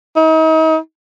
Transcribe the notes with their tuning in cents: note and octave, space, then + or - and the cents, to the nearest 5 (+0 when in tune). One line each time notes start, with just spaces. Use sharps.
D#4 +40